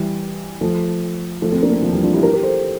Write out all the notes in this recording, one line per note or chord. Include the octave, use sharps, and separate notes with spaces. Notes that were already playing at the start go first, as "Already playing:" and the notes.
Already playing: E3 G3
F3 A3
F3 A3
A3 C4
A#3 D4
A3 C4
F3
E3 G3
D4 F4
E4 G4
G4 A#4
G4 A#4
A4 C5